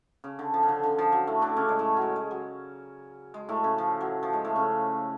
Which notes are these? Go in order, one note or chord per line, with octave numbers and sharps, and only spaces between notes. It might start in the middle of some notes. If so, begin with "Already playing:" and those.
C#3
D3
F3
C#3
D3
D3
F3
F#3
A2 A3
D3 D4
C#3 C#4
G#3
A2 A3
F#3 G#3
G#3
F#3
G#3
A2 A3
C#3
F3
F#3
F3
G#3
A2 A3
C#3 C#4